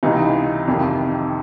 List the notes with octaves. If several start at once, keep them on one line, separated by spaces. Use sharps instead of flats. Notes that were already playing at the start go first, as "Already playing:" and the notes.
C#2 C3 E3 D#4
F2 C3 D#3